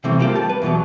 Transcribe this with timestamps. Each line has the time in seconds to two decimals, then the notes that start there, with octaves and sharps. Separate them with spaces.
0.04 C3 E3 G3 A3 C4
0.19 G3 A3 A#3 C4 F4 G4
0.35 A5
0.49 B4
0.62 E2 B2 F3 F#3